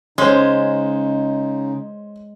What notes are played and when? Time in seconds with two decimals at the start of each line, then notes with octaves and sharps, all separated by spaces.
0.18 C#3 G#3 C#4 D#4 C5